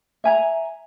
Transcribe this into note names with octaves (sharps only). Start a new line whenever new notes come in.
E5 G#5 A#5